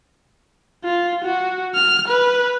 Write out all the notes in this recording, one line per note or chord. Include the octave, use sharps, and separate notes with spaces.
F4
F#4
F6
B4